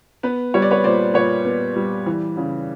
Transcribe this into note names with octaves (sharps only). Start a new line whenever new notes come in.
B3 B4
G3 C#5
D5
B4 C#5
A#2 C5 D5
A#2 B4 C#5
B3
G3
E3
C#3